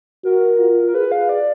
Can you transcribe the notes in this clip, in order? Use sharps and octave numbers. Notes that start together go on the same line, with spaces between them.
F#4 A#4
F4
A#4
G#4 B4
F5
D5